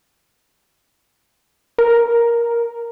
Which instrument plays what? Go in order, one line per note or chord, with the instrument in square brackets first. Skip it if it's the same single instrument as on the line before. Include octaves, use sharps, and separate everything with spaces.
[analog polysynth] A#4